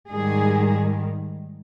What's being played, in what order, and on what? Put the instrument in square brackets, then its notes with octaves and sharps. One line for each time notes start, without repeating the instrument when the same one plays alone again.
[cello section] G#2 D#3 G3 G#4